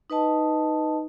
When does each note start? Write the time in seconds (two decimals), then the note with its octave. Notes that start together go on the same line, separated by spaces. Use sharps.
0.10 D#4 B4 D#5 A5